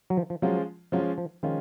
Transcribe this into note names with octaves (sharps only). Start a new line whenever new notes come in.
F#3
F3
F3
F3 F#3 G#3 C#4 F4
F3 F#3 G#3 C#4 F4
F3
D#3 F3 G#3 C#4 F4